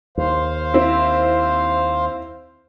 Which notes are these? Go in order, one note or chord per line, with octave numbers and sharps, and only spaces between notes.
D#2 C5 F5
C4 E4